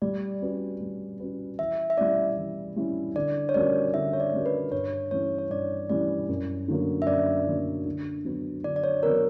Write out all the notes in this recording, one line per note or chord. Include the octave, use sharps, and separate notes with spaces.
G3 D5
C#4 F#4 B4
G3
C#4 F#4 B4
E3 E5
E5
G3 C#4 E4 D5
E3
G3 C#4 E4
D3 D5
C#5
G3 C#4 F#4 A#4 D5
D3 E5
C#5
D5
G3 C#4 F#4 A#4
B4
G2 C#5
E3 G3 C#4 C#5
C#5
G2 D5
E3 G3 C#4 D5
F#2
D3 F#3 A#3
E5
F#2 D5
D3 F#3 A#3
D3
F#3 B3
D3 D5
D5
C#5
F#3 B3 A#4